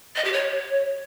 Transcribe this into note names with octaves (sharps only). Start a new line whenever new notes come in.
D#5
G4
C#5